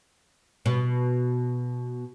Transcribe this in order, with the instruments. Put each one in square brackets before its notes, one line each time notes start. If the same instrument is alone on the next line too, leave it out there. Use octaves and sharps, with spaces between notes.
[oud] B2